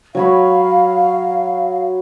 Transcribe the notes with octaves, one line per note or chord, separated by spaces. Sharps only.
F#3 C#5 F5 B5